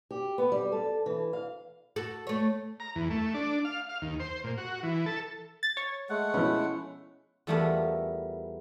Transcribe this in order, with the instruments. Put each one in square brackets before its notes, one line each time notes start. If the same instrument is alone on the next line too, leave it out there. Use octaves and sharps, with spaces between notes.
[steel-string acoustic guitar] G4
B3
G3
A4
E3
F5
[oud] F#4 A4
A3 C#5
[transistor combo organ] A#5
E2
A3
D4
F5
F5
D#2
C5
A#2
F#4
E3
A4
[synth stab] A6
C#5
[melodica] G#3 A3 F#5
[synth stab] B2 F3 [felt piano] C#4 E4
[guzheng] E2 F3 G3 A3 B3 A#4